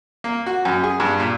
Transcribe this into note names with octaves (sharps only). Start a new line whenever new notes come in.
A#3
F#4
F#2
G#4
G2
A#2